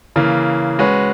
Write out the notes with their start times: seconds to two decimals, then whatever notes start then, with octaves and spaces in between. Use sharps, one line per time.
0.16 C#3 E3 A#3
0.79 G#3 C#4 F#4 B4